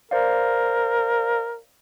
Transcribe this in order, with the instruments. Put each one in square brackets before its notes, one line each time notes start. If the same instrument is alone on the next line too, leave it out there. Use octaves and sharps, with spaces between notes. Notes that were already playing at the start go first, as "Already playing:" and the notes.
[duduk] A#4 [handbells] C5 D5 F5